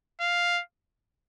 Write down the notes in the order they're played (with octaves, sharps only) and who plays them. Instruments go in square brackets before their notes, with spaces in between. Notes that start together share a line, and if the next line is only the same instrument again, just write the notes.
[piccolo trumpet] F5